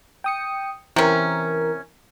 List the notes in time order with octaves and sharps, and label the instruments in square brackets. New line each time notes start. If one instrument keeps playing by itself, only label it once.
[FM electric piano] G5 D#6 C#7
[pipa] C3 C#4 [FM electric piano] E3 A#4